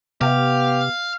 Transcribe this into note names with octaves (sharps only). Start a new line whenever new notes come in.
C3 B3 G4 F5